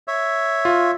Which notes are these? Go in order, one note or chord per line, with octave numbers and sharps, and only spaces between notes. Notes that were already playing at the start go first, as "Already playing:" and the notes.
C#5 E5
F4